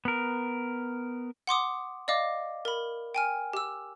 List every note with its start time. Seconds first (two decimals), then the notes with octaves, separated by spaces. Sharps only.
0.05 B3 A#4
1.47 F#5 C6 D6 D#6
2.08 D5 D#5 F5 D6
2.65 A#4 B5
3.15 G5 G#5 F6
3.53 G4 E6